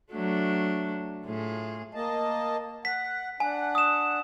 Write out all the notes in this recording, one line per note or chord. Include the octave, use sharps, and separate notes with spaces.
F#3 A3 D4
A2 F4 G#4
A#3 D#5 A5
F#5 B6
D4 F#5 G#5
D#6 E7